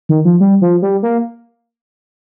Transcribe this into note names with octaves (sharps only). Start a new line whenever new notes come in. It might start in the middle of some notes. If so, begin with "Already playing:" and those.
D#3
F3
G3
F3
G3
A#3